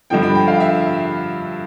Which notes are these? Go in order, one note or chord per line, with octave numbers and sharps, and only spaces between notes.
G2 D3 F3 G5
B5
G5
F5
E5